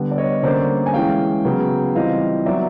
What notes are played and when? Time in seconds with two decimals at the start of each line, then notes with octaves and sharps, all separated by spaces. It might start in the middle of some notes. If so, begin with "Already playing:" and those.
Already playing: D3 G3 B3
0.11 D5
0.18 C#5 D#5
0.43 D3 G3 A#3 C#4 C5 D5
0.86 G#5
0.94 E3 G#3 C#4 F5 G5
1.45 C#3 F#3 B3
1.95 E3 G3 C4 F4 D#5 F5
2.46 F#3 B3 D#4 D5 E5